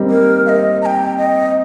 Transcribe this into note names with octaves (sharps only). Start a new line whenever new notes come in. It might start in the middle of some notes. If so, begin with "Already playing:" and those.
Already playing: G3 A#3 C4 D#4
A#4
F5
D#5
A#5
G5
D#5